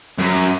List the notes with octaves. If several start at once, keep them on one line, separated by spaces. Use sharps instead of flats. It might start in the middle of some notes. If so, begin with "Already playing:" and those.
F#2